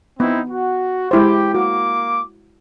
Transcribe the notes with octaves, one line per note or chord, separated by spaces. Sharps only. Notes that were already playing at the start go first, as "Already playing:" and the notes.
B3 C4 D#4 E4
F#4
G#3 E4 G4 C5
A#3 F#4 D6